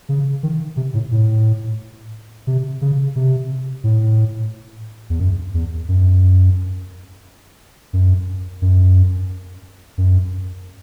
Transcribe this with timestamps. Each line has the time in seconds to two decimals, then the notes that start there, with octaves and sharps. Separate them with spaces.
0.09 C#3
0.43 D#3
0.77 C3
0.94 A2
1.11 A2
2.47 C3
2.81 C#3
3.16 C3
3.84 A2
5.10 E2
5.20 F#2
5.54 E2
5.88 F#2
7.93 F#2
8.62 F#2
9.98 F#2